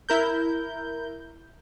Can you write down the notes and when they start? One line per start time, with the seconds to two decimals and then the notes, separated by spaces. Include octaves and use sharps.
0.09 E4 A#4 G6